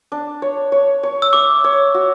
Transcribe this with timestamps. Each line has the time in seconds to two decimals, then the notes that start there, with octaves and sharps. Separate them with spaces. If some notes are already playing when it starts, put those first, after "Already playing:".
0.12 D4
0.42 C#5
0.72 C#5
1.03 C#5
1.22 E6
1.33 E5 D6
1.64 C#5
1.94 F#4